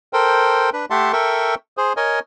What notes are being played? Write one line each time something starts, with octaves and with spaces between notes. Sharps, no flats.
A4 A#4 C5 G5
D4 B4
A3 G4 E5 F#5 A5 C6
A4 A#4 E5 G5 C#6
G#4 C5
A#4 C#5 D#5 G#5